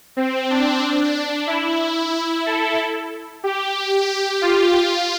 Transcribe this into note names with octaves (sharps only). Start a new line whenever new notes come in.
C4
D4
E4
A4
G4
F4
F4